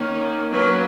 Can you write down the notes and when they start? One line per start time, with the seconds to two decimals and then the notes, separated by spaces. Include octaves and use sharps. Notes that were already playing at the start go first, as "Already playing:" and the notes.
Already playing: D#3 A#3 C#4
0.52 F#3 A#3 C#4 B4